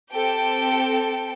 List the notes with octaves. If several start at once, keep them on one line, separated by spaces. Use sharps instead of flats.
C4 G4 A4 G5